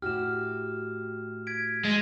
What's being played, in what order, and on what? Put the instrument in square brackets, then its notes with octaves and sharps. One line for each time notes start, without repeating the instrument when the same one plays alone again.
[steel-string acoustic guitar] A2 F#4 G4 [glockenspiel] F6 E7
[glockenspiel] G#6 B6 D7
[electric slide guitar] G#3 [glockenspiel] A6 A#6